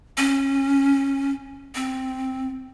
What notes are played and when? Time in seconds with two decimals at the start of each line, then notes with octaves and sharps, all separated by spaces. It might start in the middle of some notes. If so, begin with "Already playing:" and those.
0.17 C#4
1.75 C4